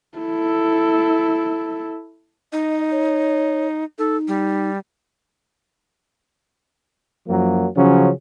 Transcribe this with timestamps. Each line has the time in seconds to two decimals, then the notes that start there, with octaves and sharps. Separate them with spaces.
0.18 E4 A4
2.53 D#4 D#5
2.91 C#5
3.99 D#4 A4
4.28 G3
7.28 F#2 F3 F#3 A#3
7.76 C#3 F3 F#3 C#4